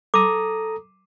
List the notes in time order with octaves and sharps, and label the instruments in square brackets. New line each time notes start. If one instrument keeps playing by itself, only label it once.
[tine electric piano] A4 A#5 D#6 [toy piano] D6